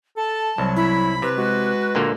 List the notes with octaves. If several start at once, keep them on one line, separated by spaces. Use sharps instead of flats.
A4 A5
C2 F#3
E4 B5
C3 B4
G#3 F#4
A#2 D3 A#3